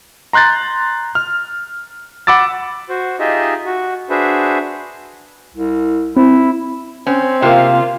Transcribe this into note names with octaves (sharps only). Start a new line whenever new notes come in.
A#5 C6 F#6 G6 A6
F6
F#5 B5 D6 E6 A6
F#4 C5
D#4 F4 G4 G#4 D#5 E5
F#4
D4 F#4 G#4 B4 C5 E5
C2
C4 E4
C4 C#4
C3 A#3 F4